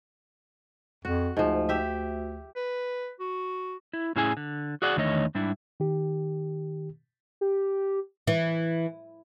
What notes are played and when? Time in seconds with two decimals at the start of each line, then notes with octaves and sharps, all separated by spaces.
1.05 F2 F#4
1.37 D2 G#2 F3
1.69 G4 E5
2.56 B4
3.20 F#4
3.93 E4
4.16 A2 C#4 E4 G#4 G#5
4.37 D3
4.82 F#4 G#4 D5 F#5
4.96 E2 D3 D#3 A3 C#5 D#5
5.35 G#2 G3 D4 E4
5.80 D#3 G4
7.41 G4
8.27 E3